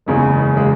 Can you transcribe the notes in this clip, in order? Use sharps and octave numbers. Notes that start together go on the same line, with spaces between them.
F#1 E2 C#3 G#3
C#3 G#3